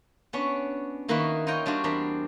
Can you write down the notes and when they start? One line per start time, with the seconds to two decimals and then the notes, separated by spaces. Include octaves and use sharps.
0.33 B3 C#4 D4 F#4
1.09 D#3 A#3 D#4 E4 F#4 B4
1.47 D#4 F4 C#5 D#5 G5 A#5
1.66 G3 D4 F4 F#4
1.84 E2 C4 D4 A#4 A#5 B5